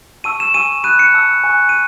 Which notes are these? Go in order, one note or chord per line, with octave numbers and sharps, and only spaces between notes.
A5 C#6 E6 D#7
E7
G#5 C#6 E6 D#7
B5 D#6 F#6 D#7
C#7
A5 C#6 E6
G#5 C#6 F#6
D#7